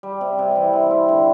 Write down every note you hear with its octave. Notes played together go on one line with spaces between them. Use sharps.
G3
C3
C3
E3
C4
E4
D3